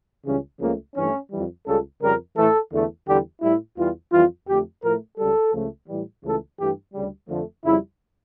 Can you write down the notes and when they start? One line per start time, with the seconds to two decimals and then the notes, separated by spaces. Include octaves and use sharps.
0.25 C#2 C#3 E3 G3 C#4
0.60 C#2 C#3 F3 A3 A#3
0.95 G2 E3 A3 C#4
1.31 F2 E3 G3
1.66 C#2 C#3 G3 A4
2.01 F2 C#3 G3 A#4
2.36 A2 E3 A3 A4
2.72 E2 D3 A3
3.07 E2 D3 G3 G4
3.42 A2 G3 E4
3.77 E2 E3 G3 F4
4.12 F2 E3 G3 F4
4.48 F2 D3 A3 G4
4.83 A2 F3 A3 A#4
5.18 C#2 C#3 G3 A4
5.53 C#2 C#3 F3 A3
5.88 A2 E3 G3
6.24 C#2 C#3 E3 A3 A4
6.58 G2 E3 A3 G4
6.94 D2 C#3 G3
7.29 F2 D3 F3 A3
7.64 F2 C#3 G3 E4